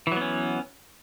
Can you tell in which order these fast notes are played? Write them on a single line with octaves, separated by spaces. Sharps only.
E3 F#3 B3 C#4